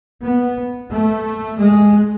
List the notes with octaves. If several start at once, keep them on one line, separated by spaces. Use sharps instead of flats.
B3
A3
G#3